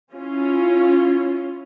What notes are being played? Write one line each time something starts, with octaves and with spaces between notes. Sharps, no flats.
C#4 E4 F4